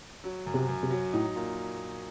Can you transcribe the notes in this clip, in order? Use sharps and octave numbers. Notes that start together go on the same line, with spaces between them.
F#3
F#2
C3
F#2
C3
F#3
A2 D#4
A#2